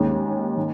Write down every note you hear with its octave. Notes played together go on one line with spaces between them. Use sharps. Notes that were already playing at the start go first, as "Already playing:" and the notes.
Already playing: D#2 D#3 G#3 C#4
D#3